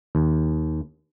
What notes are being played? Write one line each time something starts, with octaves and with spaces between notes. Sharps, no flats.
D#2